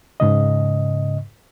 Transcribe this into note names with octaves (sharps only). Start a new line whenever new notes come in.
G#2 C#3 D#5